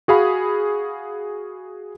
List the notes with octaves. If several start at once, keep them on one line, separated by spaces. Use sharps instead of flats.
F#4 G#4 F5 B5